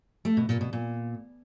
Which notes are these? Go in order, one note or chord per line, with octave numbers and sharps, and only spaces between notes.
A3
B2
A#2
B2
A#2